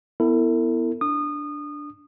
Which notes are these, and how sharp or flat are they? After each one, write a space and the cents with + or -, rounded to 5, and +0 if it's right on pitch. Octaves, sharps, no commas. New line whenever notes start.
B3 +0 E4 +0 A4 +45
D4 +0 D#6 -25